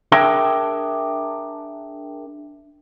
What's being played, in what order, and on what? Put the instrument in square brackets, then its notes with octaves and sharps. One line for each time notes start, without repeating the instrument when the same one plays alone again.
[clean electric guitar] D4 G#4 A#4 E5 G5 A5